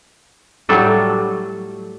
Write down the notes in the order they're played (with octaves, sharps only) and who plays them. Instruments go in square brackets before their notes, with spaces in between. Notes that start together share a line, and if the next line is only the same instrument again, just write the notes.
[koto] A2 F#3 G3 A4